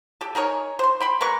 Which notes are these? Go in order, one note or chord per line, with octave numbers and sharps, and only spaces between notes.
G4 A4
D#4 G#4 A#4 C#5
C5 C6
G5 B5 C6
G#3 A#4 B4 C#6